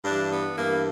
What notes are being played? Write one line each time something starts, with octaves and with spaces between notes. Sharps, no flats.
G2 E3 D4
B3
G2 E3 A#3